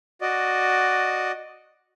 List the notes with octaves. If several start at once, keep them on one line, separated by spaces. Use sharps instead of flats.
F#4 D5 D#5